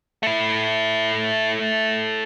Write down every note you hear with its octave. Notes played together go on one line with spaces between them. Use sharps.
A3 E4